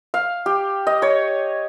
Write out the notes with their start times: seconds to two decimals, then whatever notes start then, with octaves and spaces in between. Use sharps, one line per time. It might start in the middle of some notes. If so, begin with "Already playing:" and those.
0.14 F5
0.46 G4
0.87 D#5
1.02 C#5